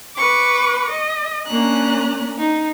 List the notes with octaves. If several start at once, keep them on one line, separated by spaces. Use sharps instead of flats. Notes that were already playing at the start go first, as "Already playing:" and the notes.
B4 C#6 D6
D#5
A#3 C#4 D4 A#5 F#6
D#4